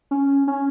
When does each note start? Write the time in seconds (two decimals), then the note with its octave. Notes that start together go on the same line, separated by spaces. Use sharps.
0.11 C#4
0.48 C#4